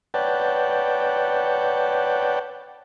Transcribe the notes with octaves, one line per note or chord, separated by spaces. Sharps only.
B4 C#5 D5 F#5 G5 A5